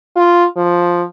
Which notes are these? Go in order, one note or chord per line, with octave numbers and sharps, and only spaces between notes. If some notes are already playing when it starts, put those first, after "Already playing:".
F4
F3